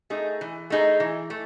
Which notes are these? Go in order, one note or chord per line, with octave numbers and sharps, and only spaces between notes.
A3 D#4 G#4
E3
A3 D#4 G#4
E3
A3